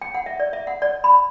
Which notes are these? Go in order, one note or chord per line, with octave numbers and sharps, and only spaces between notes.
G5
F#5
E5
D5
E5
F#5
D5
B5